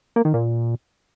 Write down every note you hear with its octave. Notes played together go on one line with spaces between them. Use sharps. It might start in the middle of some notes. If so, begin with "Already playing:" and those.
A#3
D#3
A#2